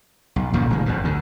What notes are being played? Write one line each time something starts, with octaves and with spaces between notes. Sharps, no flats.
B1
A1 G2 A#2 C#3
F1 A#2 D#3 G#3
G#1 F2 B2
D2 D3